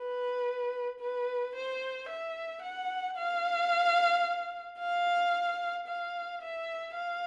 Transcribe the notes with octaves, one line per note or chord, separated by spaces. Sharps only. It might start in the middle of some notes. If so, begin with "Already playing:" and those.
Already playing: B4
B4
C5
E5
F#5
F5
F5
F5
E5
F5